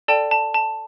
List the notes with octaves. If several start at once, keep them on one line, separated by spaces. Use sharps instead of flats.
A4 D5 G5 A5
A5
A5